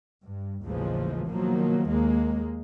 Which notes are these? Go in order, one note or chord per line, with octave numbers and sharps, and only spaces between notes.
G2
A1 D#2 C#3 E3 F3 G#3
B2 D#3 F3 F#3 A#3
D#2 G#3 A#3